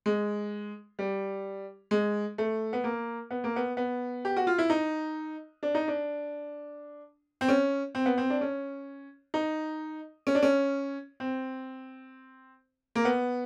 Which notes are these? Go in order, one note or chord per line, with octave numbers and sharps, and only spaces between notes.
G#3
G3
G#3
A3
B3
A#3
B3
A#3
B3
B3
G4
F#4
F4
E4
D#4
D4
D#4
D4
C4
C#4
C4
B3
C4
D4
C#4
D#4
C#4
D4
C#4
C4
A#3
B3